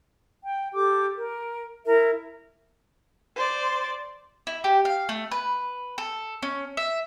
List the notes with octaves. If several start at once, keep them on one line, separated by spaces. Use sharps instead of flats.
G5
G4 A4 D6
A#4
E4 A#4 E5
C5 D5
E4
G4
F5
A3
B4
A4
C#4
E5